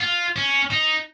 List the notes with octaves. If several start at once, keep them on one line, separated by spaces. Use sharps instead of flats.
F4
C#4
D#4